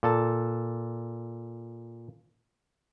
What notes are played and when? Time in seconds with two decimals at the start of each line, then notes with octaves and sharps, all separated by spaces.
0.03 A#2 A4 A5